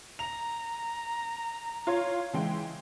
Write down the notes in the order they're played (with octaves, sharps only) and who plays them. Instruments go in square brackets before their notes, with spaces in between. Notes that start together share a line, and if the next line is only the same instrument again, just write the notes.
[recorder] A#5 [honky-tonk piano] F7
[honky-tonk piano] F4 C#5 G#6
E3 G#3 G5